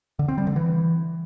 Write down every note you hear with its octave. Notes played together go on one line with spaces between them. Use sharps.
D3
C4
G3
D3
E3